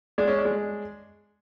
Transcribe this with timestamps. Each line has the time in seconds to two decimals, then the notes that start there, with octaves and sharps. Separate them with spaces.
0.18 G#3 D4
0.28 C#4
0.38 D4
0.45 G#3